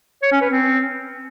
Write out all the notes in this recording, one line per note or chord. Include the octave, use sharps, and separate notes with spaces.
C#5
C#4
B4
C4